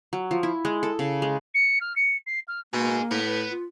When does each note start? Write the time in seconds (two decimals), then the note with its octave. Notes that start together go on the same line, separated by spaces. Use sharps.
0.13 F#3
0.31 F3
0.43 E4
0.65 G#3
0.83 A4
0.99 C#3
1.22 G#3
1.54 C#7
1.81 F6
1.96 C#7
2.26 C7
2.48 F6
2.73 B2 A#3 D#4 G#4
3.11 A2 B3
3.27 B4
3.50 F4